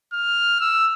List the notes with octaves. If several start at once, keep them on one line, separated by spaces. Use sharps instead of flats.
F6
E6